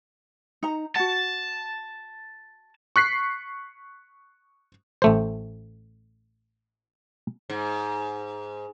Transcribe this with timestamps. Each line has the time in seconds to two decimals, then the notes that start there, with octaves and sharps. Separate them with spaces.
0.63 D#4 A#5
0.96 F#4 F#5 A5
2.96 C#6 F#6 B6 C7
5.02 A1 A3 C5
7.50 G#2